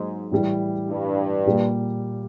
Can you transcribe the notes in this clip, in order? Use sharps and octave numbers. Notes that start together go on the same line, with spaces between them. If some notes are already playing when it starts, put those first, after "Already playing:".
Already playing: G#2 F#3 A#3
A2 E3 G3
G2
A#2 G3 A#3